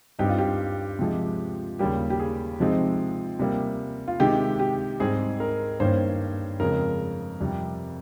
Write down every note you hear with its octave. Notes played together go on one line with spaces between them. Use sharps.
G2 G3 C4 D#4 G4
F4
G4
C3 F3 G#3
D#2 C#3 G3 A#3 G4
G4
G#4
C3 F3 G#3 C4 D#4
C3 G3 A#3
F4
C3 D#3 G#3 G4
G4
G#2 G3 C4 G#4
A#4
G2 D#3 A#3 C#4 C5
F2 C#3 G#3 A#4
F2 C3 G3